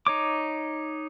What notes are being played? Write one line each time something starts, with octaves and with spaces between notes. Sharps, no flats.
D#4 C#5 D6